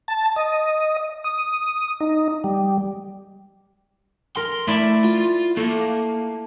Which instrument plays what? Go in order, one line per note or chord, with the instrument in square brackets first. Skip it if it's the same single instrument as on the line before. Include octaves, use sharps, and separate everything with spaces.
[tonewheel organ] A5
D#5
D#6
D#4
G3
[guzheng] A#4 [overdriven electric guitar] C6
[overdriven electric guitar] A3 [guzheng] E4 D5 E5
[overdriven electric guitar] F4
[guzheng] A3 [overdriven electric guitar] A#3